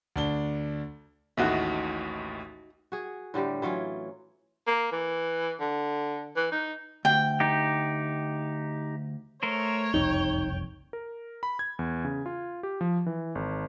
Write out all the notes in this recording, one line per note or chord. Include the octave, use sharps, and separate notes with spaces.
D2 D4 G7
A1 D#2 A2 D#4 F#4 E5
F#4 G#4
A2 D3 G3 G4
E3 F#3 C#4 F4
A#3
E3
D3
E3
D#4
D2 G5
D#4 G4
A3 A#4 C5 C#5
F#1 C2 F2 D#4 G5
A#4
B5
G#6
E2
C#3
F4
G4
F3
E3
G#1